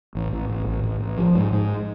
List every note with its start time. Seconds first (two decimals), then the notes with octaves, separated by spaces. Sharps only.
0.15 A1
0.32 A1
0.49 A1
0.67 A1
0.83 A1
1.00 A1
1.18 F3
1.35 G#2
1.52 G#2